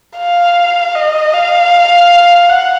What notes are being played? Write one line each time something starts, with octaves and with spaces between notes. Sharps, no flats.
F5
D#5
F5
F#5